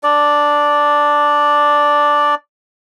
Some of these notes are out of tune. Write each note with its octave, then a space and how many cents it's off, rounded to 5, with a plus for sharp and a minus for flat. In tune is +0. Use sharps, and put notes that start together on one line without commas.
D4 +0 D5 +0